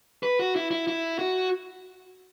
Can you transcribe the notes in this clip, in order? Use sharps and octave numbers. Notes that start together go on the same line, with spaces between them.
B4
F#4
E4
E4
E4
F#4